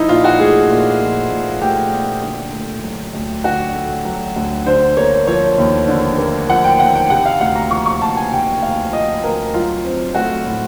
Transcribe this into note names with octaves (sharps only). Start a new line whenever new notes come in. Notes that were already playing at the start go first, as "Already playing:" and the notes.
Already playing: F3 D#4 E4
A#2 F4
F#4
A3 G#4
A#2
F3
A#2
A3 G4
A#2
D3
A3
F#3
D2
D3 F#4
A3
F#3
D2
D3 C5
A#3 C#5
F3 C#5
D#2
D3
A#3
F3 F#5
G5
D#2 F#5
G5
C3 F#5
F5
D2 F#5
A#5
F3 C#6
C#6
D2 A5
G#5
C3 G5
D2 F5
F3 D#5
D2 A#4
F#3 F4
C4
A3 F#4
A2